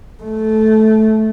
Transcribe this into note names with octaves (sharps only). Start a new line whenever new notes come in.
A3